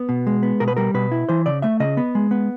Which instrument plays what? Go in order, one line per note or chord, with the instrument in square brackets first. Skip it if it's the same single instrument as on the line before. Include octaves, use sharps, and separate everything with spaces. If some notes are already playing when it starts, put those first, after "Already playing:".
Already playing: [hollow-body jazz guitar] B3
B2
G#3
B3
B2 A#4
B4
G3 A#4
B2 B4
E4
E3 C5
C#3 D5
A3 E5
C#3 D#5
B3
G#3
B3